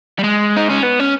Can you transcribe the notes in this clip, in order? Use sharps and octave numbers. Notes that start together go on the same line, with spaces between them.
G3
G#3
D#4
C#4
B3
C#4